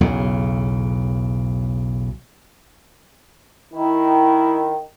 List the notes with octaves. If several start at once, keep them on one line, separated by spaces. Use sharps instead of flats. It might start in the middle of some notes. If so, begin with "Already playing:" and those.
B1 E2 C#3
D#3 E4